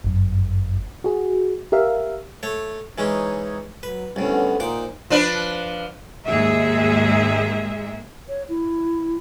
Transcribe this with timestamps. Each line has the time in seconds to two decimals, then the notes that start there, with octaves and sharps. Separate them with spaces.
0.04 G1 F#2
1.04 F#4 G#4
1.72 G4 A#4 E5 F5
2.43 A3 C#5
2.98 E3 G#3 C#4 D#4 C#5
3.83 F#3 B4
4.16 C2 A2 D3 B3 C#4
4.60 A#2 D#4 C5 F#5 D6
5.10 F3 D4 B4
6.27 D#2 G#2 G#3 G#4 E5
8.29 C#5
8.49 E4